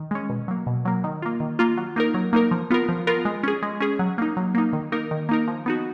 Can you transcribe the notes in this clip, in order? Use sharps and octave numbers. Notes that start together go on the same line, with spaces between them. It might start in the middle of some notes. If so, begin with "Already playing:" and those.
Already playing: D#3
G#3 C#4
B2
F#3 A#3
B2
F#3 A#3
D#3
A#3 F4
D#3
A#3 F4
F#3
A#3 D#4 A#4
F#3
A#3 D#4 A#4
F3
B3 F4 A#4
F3
B3 F4 A#4
G#3
C#4 G#4
G#3
C#4 G#4
F#3
A#3 D#4
F#3
A#3 D#4
D#3
A#3 D#4 A#4
D#3
A#3 D#4 A#4
F3
B3 D#4 F#4